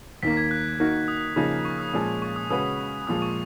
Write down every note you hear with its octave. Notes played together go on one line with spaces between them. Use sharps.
D#2 D#3 A#3 B6
G#6
F#6
D#3 A#3 D#4 F#4 A#4
D#6
C#3 F3 A#3 D#4 G#4
C#6
D#6
A#2 F3 G#3 C#4 G#4
C#6
D#6
C#3 G#3 C#4 F#4 B4 D#6
A#2 F3 G#3 D#6
C#6